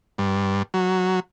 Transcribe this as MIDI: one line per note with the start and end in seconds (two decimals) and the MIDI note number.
0.18 0.63 43
0.74 1.20 54